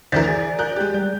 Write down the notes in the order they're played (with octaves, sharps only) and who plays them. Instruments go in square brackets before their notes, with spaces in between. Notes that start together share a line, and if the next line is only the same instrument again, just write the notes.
[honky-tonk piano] D2 E3 A#4 [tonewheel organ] C5 D5 E5
[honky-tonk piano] G#4 [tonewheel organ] D5
[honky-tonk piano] A#4 F#6 G6
G#3 G4
[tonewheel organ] G3 [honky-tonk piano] G6